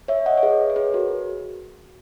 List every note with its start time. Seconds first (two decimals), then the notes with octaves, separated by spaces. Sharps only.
0.08 C#5 E5
0.26 D#5 F#5
0.37 C#5
0.43 G#4 B4
0.70 C#5
0.76 G#4 B4
0.93 F#4 A#4